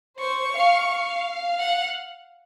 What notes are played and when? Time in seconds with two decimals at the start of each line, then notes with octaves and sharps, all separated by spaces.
0.20 C5 C#6
0.54 F5
0.89 F5
1.59 F#5